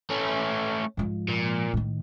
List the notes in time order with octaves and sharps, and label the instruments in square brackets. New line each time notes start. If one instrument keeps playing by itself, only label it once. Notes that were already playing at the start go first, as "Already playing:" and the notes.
[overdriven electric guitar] A3 C#4
[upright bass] G#2 F3
[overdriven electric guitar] A#2
[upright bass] A2 D#3